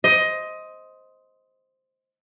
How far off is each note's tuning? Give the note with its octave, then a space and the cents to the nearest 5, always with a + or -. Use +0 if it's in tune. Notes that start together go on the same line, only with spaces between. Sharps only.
C5 +0 D#5 +15